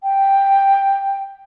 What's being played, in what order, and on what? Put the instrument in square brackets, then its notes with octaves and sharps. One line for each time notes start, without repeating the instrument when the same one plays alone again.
[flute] G5